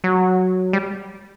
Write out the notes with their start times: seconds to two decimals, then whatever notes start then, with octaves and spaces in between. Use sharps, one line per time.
0.04 F#3
0.73 G3